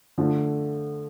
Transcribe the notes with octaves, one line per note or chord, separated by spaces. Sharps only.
D3 F3 A3